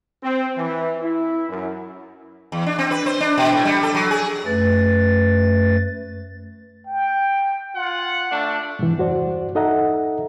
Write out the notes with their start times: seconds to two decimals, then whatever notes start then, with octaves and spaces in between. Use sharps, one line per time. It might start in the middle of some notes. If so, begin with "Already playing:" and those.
0.23 C4
0.57 E3
1.01 E4
1.50 F#2
2.52 E2
2.66 D4
2.78 C4
2.91 B4
3.06 C5
3.21 D4
3.38 B2
3.52 A2
3.65 G3
3.83 A4
3.94 F#3
4.11 G#4
4.45 F#2 A3 B4 A6
6.87 G5
7.75 F4 F#5
8.31 A3 D4
8.79 G#2 C3 E3
8.98 E2 G2 F#4 C5 D5
9.55 D#4 A4 D#5 E5 F#5 A#5